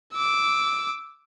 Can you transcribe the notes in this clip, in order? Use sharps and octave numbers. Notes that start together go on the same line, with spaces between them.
D6 E6